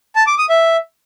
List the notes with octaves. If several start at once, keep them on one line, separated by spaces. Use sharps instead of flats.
A5
D6
D#6
E5